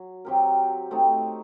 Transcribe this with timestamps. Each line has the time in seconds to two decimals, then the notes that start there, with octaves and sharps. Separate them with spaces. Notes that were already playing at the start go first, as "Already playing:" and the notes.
Already playing: F#3
0.25 F#3 C4 G4 A#4
0.91 A3 C4 D#4